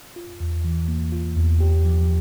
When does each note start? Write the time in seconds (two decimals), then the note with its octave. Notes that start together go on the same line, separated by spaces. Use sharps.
0.16 F4
0.40 E2
0.65 E3
0.88 A#3
1.12 F4
1.36 E2
1.60 G4
1.85 F3